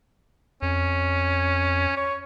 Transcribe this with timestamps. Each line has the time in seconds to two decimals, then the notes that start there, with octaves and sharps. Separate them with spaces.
0.62 F2 C#4
1.97 C#5